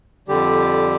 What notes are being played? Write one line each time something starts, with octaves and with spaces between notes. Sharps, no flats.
F2 D3 G3 G4